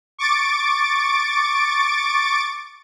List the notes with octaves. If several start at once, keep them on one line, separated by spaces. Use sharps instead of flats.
C#6 D6 A6 D7